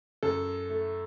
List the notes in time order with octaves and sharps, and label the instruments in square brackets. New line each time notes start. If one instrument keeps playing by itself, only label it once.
[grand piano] F#2 A4
A3